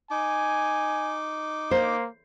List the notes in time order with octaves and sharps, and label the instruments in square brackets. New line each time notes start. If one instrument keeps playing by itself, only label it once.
[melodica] D#4 D6 [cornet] G#5
[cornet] A#3 [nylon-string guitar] C5